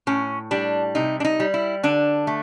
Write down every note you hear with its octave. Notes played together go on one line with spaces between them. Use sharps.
A2 C#4
G3 D4
C3 D#4
D4
D#4
G3
E4
D3 D4
A3